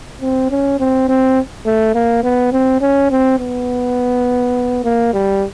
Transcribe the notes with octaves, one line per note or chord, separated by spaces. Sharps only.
C4
C#4
C4
C4
A3
A#3
B3
C4
C#4
C4
B3
A#3
G3